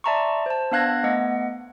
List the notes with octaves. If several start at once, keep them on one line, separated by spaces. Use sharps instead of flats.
D5 E5 A5 A#5 C6 C#6
C5 A5
B3 D4 F5 F#6 G#6 A#6
A3 B3 D#5 F#5